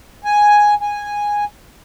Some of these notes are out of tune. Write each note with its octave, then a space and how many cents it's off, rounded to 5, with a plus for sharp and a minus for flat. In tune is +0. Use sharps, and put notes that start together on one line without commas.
G#5 +0
G#5 -10